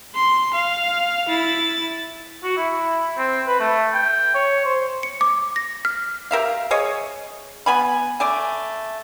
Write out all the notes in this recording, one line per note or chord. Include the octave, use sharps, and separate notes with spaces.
C6
F5
E4 A6
F#4
E4
C4
B4
A3
G5
C#5
C5
C#7
D6
A#6
F6
G4 A#4 E5 F5
G#4 C#5 D#5
B3 G#5 B5
A3 D5 G#5